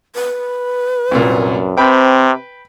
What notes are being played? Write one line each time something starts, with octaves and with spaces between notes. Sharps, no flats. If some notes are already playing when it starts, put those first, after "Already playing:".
B4
C2 F#2 A#2
C3 C4 B4 G5